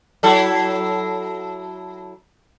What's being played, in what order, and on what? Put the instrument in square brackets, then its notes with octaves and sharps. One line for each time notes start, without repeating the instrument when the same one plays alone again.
[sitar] F#3 E4 A4